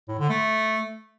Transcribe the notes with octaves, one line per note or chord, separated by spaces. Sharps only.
A2
D3
A3